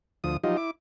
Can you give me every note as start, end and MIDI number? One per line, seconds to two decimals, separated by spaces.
0.24 0.37 38
0.24 0.37 53
0.24 0.37 87
0.44 0.57 53
0.44 0.57 54
0.44 0.57 63
0.44 0.57 65
0.44 0.57 67
0.44 0.57 75
0.57 0.71 64
0.57 0.71 86